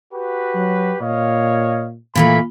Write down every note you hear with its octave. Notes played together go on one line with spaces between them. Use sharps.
F#4 G4 B4
F#3
A#2 C#5 D#5 F5
A#2 E3 A3 A#3 F5 B5